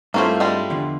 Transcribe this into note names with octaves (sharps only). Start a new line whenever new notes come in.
G2 A3 A#3 C4 C#4 E4 F4 C5
G3 G#3
E2 D3 F3